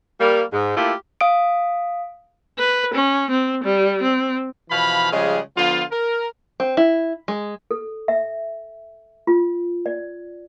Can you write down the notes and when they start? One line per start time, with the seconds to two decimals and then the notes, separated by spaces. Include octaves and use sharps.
0.21 G3 A#3
0.53 G#2
0.77 A3 A#3 E4 F4 G4
1.21 F5 D#6 D7
2.59 B4
2.94 C#4
3.31 C4
3.64 G3
4.03 C4
4.70 B2 E3 F3 F5 B5
5.12 C#3 F3 G3 G#3 G#4 F5
5.57 D3 F3 B3 F4
5.91 A#4
6.60 C4
6.77 E4
7.28 G#3
7.71 A4
8.08 E5
9.27 F4
9.86 D5